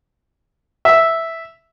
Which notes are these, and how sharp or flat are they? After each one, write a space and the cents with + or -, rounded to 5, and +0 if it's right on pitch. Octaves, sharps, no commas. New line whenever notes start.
E5 -5